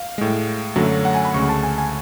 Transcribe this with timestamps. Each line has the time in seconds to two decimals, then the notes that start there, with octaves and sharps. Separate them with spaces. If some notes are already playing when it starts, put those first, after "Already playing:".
Already playing: F5
0.18 A2 G#3
0.76 F#2 D3 F#3 A3
1.05 F#5
1.15 G#5
1.25 B5
1.34 D2 C#3 G#3 C#6
1.49 A5
1.63 G#5
1.78 G#5